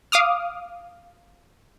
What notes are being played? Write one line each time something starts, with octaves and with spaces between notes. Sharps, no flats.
F5 D6 D#6 F6